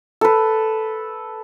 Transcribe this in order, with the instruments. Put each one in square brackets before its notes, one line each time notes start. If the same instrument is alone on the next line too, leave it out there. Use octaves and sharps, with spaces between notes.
[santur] A4 B4